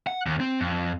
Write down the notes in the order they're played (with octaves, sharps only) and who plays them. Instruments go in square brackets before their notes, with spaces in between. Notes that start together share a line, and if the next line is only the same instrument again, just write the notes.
[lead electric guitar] F#5
D#2
C4
F2